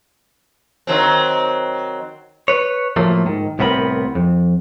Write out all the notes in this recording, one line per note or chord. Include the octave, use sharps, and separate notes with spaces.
D#3 F#3 C4
B4 C#5
A2 F3 F#3 A3 A#3
G#2 D#3
C2 A2 B3 C4 A#4 B5
F2